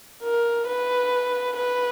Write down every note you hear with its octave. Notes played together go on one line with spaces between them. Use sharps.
A#4
B4
B4